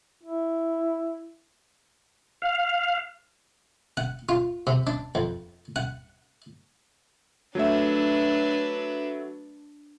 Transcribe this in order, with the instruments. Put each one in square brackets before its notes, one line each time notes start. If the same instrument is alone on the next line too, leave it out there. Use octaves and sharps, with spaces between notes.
[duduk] E4
[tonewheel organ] F5
[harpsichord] F#5
F4
C3
D4
F2
F#5
[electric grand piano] F#3 A3 E5 [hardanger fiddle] D4 B4